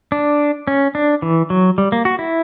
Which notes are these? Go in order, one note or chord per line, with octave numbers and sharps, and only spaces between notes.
D4
C#4
D4
E3
F#3
G3
A#3
F#4
E4